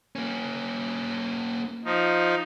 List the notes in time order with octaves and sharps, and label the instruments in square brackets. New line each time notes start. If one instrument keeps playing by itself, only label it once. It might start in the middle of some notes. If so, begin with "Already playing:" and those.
[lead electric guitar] A#3 C#4
[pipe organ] F3 D#4